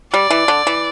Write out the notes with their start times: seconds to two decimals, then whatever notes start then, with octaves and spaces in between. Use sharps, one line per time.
0.13 G3 D5
0.30 E3
0.48 D3
0.67 E3